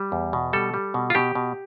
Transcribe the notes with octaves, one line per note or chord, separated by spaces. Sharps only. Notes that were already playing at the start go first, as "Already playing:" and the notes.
Already playing: G3
E2
B2
G3 A4
G3
B2
F4
B2 G4
B2